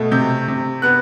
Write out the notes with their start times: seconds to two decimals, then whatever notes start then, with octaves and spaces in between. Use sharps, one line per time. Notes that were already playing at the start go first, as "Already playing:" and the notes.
Already playing: B2 A3
0.12 C3 G6
0.48 C3
0.82 B3 F#6